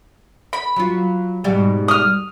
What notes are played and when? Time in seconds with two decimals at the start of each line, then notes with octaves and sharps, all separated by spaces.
0.53 B5
0.76 F#3 F4
1.44 G#2 B2 G3
1.88 D#6 F6